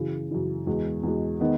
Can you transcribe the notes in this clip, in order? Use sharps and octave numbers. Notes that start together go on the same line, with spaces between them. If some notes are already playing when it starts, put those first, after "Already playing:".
Already playing: F#2 C#3 E3
F#2 C#3 E3
E2 B2 G#3
E2 B2 G#3
D#3 G#3 B3 D#4